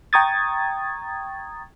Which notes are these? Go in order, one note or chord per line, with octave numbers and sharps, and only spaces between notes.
G5 A#5 C#6 D#6 G#6 A6